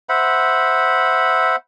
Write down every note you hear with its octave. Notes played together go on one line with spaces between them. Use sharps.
C5 E5 F#5 B5